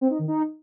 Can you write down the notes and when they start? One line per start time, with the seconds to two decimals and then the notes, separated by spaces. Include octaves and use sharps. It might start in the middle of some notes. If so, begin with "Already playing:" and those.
0.01 C4
0.10 D#4
0.19 D#3
0.28 D#4